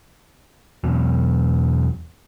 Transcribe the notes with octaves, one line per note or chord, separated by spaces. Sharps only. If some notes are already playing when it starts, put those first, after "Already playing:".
E2 B2 F#3